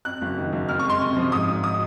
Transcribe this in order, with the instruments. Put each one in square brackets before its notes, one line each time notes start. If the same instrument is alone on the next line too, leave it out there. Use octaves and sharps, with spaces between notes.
[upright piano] F2 F#6
F#1
D#3
F#1
F2 F6
C#6
G#3 C6
C3
F3
G#2 D#6
G#1
D#6